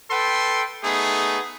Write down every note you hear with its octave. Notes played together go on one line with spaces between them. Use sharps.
A4 B4 G5 C6
A3 B3 D#4 G#4